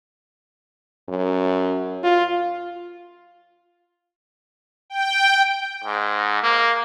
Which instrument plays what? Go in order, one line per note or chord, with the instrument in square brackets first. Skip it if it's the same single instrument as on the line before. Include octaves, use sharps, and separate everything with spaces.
[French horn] F#2
F4
[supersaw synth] G5
[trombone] G#2
A#3